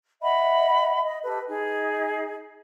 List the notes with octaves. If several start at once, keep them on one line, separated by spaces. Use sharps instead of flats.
D#5 E5 F#5 B5
D#5
G4 A4 B4
D#4 G#4